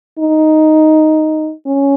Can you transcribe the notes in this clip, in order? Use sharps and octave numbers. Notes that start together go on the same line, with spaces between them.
D#4
C#4